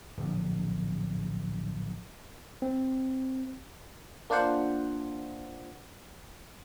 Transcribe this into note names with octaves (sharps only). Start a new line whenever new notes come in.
D1 A#1
C4
A#3 D4 F4 C5 F#5